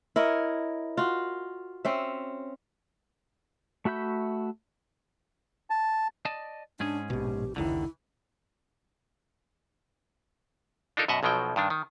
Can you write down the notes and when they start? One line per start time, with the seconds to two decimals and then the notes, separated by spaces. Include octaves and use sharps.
0.16 E4 A#4 C#5 D#5
0.97 F4 F#4
1.85 C4 C#4 E5
3.85 A3 F#4 E5 B5 G6
5.70 A5
6.25 D5 D#5 A5
6.80 G#2 C#4 D4 G#4
7.10 A#1 B2 G4
7.56 F1 C#2 D3 D#3 E4
10.97 D4 D#4 F4 A4 A#4
11.08 F#2 B2 D#5 E5 F#5
11.23 B1 B2 F3 F#3 G5
11.56 G2 D#3 D4
11.70 D#3